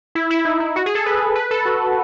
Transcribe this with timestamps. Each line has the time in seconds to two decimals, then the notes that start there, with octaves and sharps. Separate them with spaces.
0.15 E4
0.31 E4
0.45 D#4
0.60 E4
0.76 F#4
0.86 G#4
0.95 A4
1.06 B4
1.35 B4
1.51 A4
1.65 F#4